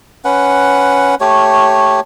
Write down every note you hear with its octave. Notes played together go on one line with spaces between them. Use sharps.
C#4 B4 F#5
A3 G4 C#5